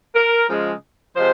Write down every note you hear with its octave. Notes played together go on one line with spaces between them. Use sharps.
A#4
C#3 F3 G#3
C3 F3 G#3 C5